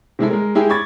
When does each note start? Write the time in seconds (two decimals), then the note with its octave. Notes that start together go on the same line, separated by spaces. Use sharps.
0.19 C3 G#3 E4 A4
0.31 G#3 A#4
0.55 G#3 E4 G4 G#4
0.70 B5 C#6 D6 G#6 A6